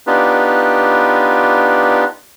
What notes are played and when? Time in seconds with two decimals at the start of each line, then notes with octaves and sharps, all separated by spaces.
0.07 B3 D4 D#4 F4 G4 B4